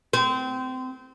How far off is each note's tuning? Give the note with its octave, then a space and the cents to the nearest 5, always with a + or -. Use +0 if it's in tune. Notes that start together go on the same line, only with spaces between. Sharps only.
C4 -25